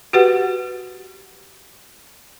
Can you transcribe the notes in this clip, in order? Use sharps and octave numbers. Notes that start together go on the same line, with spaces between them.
F#4 G4 B4 F#5